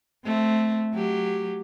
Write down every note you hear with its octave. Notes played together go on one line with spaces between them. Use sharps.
A3 C4
F#3 G4